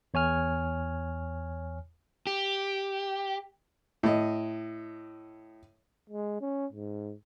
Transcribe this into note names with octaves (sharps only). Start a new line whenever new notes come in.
E2 C#5 G#5 F6
G4
A2 D#5
G#3
C#4
G#2